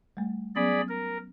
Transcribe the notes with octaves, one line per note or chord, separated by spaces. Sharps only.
G3 A3
F#3 B3 C#4 G#4 D5 B5
A#4